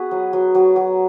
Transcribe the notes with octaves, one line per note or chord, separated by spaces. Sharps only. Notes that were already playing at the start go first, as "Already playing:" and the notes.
Already playing: B3 F#4 G#4 B4
F#3
F#3
F#3
F#3